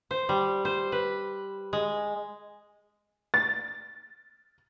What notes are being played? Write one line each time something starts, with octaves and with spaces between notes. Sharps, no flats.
C5
G3
C5
B4
G#3
A6